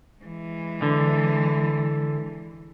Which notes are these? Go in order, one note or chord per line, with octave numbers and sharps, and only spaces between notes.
E3 G#3
D3